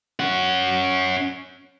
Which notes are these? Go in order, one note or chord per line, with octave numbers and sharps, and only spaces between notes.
C#4 F#5